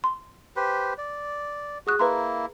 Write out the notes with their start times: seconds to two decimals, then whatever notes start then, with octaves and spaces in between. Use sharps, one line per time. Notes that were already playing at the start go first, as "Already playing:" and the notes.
0.04 C6
0.56 G4 B4 C5
0.98 D5
1.87 F#4 G#4 D#6 F#6
1.99 A#3 E4 B4 A#5 C6